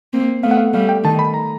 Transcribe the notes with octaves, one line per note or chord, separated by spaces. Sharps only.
A#3 C4
A3 B3 F5
F#5
F5
G3 A3 F5
G5
D#3 A5
B5
A#5